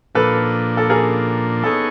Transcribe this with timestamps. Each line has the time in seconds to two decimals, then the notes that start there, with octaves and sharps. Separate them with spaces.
0.15 A#2 F3 A#3 D4 A4 B4
0.77 A4
0.90 G#4 A#4
1.63 B3 D#4 G#4 A4 C#5